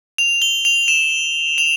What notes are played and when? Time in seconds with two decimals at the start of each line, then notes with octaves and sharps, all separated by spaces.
0.18 F7
0.42 G7
0.65 F7
0.88 E7
1.58 F7